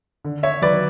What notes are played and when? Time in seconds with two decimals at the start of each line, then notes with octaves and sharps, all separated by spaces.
0.25 D3
0.43 C#5 E5
0.62 F#3 B4 D5